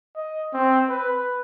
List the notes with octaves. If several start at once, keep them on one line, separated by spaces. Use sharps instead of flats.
D#5
C4
B4